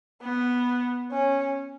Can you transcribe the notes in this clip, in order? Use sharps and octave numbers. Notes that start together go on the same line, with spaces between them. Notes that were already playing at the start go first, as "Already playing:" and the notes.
B3
C#4